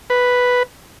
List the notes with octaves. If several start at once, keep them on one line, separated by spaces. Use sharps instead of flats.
B4